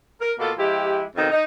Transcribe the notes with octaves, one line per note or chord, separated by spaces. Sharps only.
A#4
B2 A#3 F4 F#4 A4
F3 G#3 E4 G4
F2 B2 D#3 D#4
D#4